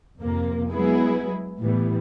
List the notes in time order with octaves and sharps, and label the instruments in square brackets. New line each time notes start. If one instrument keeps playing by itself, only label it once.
[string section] F2 C3 A#3
F#3 G#3 B3 E4 G#4
A2 E3 G3 B3